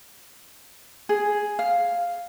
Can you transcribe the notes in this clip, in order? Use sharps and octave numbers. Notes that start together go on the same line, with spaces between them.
G#4
F5